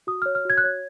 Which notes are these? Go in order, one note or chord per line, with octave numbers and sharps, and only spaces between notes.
F#4 D#6
C#5 F6
F6
F#4 G#6
F#6
C#5 G#6